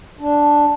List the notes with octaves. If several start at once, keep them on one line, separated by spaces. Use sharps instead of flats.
D4